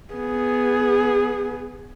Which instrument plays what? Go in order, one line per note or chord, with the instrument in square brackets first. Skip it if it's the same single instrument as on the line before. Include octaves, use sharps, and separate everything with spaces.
[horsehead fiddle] B3 G#4